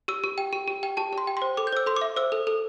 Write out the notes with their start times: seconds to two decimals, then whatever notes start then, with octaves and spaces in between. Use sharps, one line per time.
0.08 G4 E6
0.24 G4
0.38 G5
0.53 G4
0.68 G4
0.83 G5
0.97 G4 A5
1.13 G4 C6
1.27 G5
1.37 C5 C6
1.57 A4 D6
1.67 G6
1.72 C5 E6
1.86 A4 C6
1.96 E5 D6
2.16 C5 E6
2.32 A4
2.47 A4